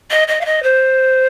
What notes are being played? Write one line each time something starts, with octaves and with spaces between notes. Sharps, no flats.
D#5
D#5
F5
D#5
C5